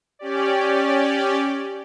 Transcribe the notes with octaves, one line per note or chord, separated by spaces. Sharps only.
C#4 G4 D5